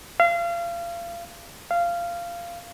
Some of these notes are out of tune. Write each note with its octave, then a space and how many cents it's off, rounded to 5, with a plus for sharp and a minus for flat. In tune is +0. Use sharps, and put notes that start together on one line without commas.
F5 -30
F5 -15